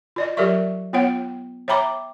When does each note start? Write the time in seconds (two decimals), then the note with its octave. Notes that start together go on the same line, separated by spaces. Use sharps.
0.16 F4 D5 D#5
0.37 F#3 G4 A#4 D5 E5 C#6
0.93 B3 F4 C#5 F#5 G5
1.68 C#5 E5 G5 A#5 B5 D6